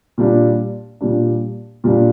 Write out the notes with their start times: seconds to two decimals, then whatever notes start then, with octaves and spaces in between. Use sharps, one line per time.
0.18 A#2 G3 D4
1.01 A#2 G3 D4
1.84 A#2 G3 D4